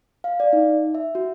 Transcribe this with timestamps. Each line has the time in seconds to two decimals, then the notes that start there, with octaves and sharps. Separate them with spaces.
0.24 F5
0.40 D5
0.53 D#4
0.95 E5
1.15 F#4